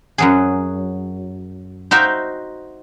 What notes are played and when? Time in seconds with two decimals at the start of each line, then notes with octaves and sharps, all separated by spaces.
0.18 F#2 F#3 G#4
1.91 D#4 F#4 C5 E5 F5 G5